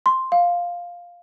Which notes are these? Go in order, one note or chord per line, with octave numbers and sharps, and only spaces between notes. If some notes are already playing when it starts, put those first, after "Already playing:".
C6
F5